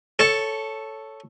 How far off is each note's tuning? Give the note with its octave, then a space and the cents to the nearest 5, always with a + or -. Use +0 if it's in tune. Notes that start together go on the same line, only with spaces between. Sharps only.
A4 +0 C#5 +0